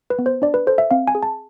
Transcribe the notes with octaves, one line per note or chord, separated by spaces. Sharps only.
B4
B3
C5
D4 D5
B4
A4 C5
E5
C4 F5
G#5
G#4
A5